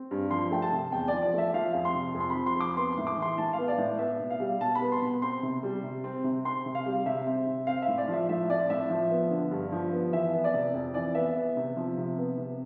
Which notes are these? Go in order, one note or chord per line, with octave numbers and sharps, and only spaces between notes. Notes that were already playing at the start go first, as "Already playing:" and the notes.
Already playing: C4
G2
F3 C6
A3 G5
A5
C3
E2 G5
D5
F3
D5
A3 E5
F3 F5
F2
C6
C3
F2
C6
B5
F3
C6
F2 D6
B3 C6
C6
A2
D6
E3 C6
A2 A5
F5
B3
D5
A2
B3 E5
B2
F5
G3
B2 A5
B5
B3
C6
B2
C4 C6
C3
G3
C3
C4
C3
C4 C6
C3
F5
G3
C3 E5
C4
C3
C4 F5
E5
A2
D5
F3 E5
A2 E5
C4 D5
A2 E5
F3
B3
D3
G2
F3
B3
E3 E5
B3
D5
C3
F2
E3 D5
B3 E5
B3
C3
F3
C3
B3
C3